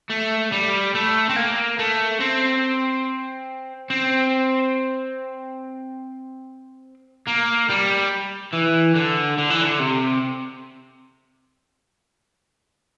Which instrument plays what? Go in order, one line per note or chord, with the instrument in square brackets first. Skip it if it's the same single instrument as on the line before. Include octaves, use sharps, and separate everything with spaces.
[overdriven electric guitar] A3
G3
A3
C4
A#3
A3
C4
C4
A#3
G3
E3
D3
D3
E3
D3
C3